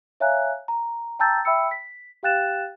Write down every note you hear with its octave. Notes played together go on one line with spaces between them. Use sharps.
C#5 E5 F5 G#5 A#5 F#6
A#5
G5 A5 A#5 E6 G6 A6
E5 G5 B5 E6 C#7
B6
G4 F5 G5 F#6 A6 E7